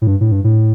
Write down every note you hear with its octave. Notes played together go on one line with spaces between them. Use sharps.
A2
G2
A2
G2
A2